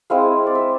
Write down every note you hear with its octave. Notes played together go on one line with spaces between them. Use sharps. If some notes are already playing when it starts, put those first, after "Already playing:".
G#3 C4 E4 F5
D5
E5